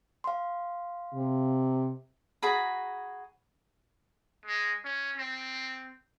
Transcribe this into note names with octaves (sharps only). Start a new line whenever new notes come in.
F5 C6
C3
F#4 G#4 A#5 B5
G#3
C#4
C4